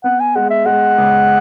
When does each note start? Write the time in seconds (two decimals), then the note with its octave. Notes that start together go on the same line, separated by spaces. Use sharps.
0.04 B3 F#5
0.20 G#5
0.35 G#3 F#5
0.50 E5
0.66 G#3 F#5
0.98 C#2